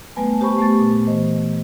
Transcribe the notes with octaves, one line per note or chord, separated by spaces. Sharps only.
G3 A3 B3 B4 G#5 A5
G4 C5 A5 B5 C#6
A3 B3 G4 A6
A#2
E3 C5 D#5